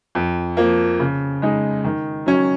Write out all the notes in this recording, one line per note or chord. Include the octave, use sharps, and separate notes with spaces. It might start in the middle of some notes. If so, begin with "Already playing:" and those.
F2
F3 A#3
C#3
G#3 D#4
D#3
F#3 C#4